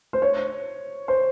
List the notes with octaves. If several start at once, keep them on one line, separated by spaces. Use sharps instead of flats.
C5
C#5
C5